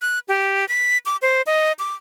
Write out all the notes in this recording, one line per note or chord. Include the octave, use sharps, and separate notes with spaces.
F#6
G4
B6
D6
C5
D#5
D6